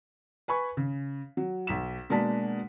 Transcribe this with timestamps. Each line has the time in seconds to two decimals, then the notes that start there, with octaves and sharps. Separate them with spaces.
0.48 B4 G#5 B5 C#6
0.77 C#3
1.37 F#3
1.67 B1 B6 E7
2.10 B2 G#3 A#3 D4 A5 B6